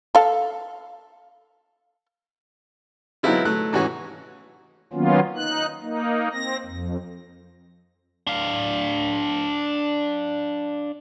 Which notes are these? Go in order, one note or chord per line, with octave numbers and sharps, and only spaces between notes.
A4 F5
F#3 G#3 B3 C4 E4 F4
F#3 A3 F#6
G#2 E3 C#4 F#4 C#5
D#3 F#3 A#3 B3 C#4 F4
D#4 F#6
A#3 D#4
C4 A#6
F2
D4 F5